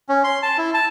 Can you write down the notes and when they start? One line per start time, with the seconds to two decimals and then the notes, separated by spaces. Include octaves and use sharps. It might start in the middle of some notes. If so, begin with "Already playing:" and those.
0.09 C#4
0.24 C6
0.43 A5
0.58 E4
0.74 A5